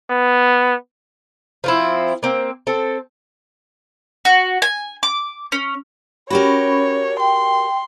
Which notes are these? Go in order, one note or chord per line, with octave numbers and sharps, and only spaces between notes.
B3
F3 C4 E4
A#3 C4
C4 A4
F#4
G#5
D6
C#4
C#4 F#4 G4 A#4 C#5 B5
G5 C6